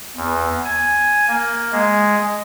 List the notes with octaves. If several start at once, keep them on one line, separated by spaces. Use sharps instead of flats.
E2
G#5
A#3
G#3